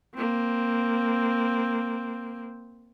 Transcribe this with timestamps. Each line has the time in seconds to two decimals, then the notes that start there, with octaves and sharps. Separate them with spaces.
0.15 A#3 C4